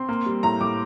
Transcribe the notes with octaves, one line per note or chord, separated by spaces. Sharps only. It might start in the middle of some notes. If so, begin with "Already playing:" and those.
Already playing: C4 C6
A#3
G3
A2 A#5
A2 D6